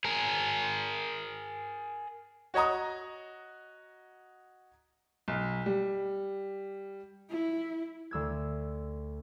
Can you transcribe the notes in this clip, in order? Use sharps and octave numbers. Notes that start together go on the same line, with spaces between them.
G#4 A#4
F#4 C#5 D#5 A#5 D#6
B1
G3
E4
D2 E6 G#6